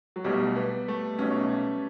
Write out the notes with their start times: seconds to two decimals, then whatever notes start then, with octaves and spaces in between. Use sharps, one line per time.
0.16 F#3
0.24 B1 B2 G3 A3
0.56 B3
0.88 A3
1.19 B1 B2 A3 C#4